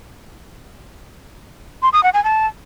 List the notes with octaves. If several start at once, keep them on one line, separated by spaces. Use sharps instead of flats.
C6
D#6
F#5
G#5
A5